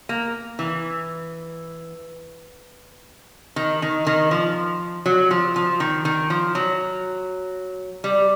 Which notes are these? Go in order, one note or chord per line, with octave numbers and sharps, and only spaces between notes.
A#3
E3
D#3
D#3
D#3
F3
F#3
F3
F3
D#3
D#3
F3
F#3
G3